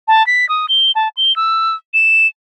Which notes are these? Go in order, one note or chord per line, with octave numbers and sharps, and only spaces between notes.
A5
B6
D#6
G7
A5
G7
E6
E7